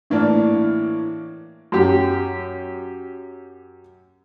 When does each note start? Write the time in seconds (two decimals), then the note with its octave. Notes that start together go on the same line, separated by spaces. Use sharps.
0.10 A2 E3 A#3 D4
1.72 F#2 G4